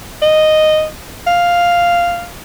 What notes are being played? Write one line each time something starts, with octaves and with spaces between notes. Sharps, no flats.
D#5
F5